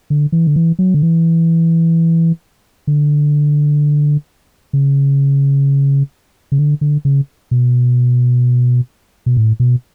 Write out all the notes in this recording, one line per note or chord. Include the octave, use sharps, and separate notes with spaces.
D3
E3
D3
E3
F#3
D3
E3
D3
C#3
C#3
D3
D3
C#3
B2
B2
A2
B2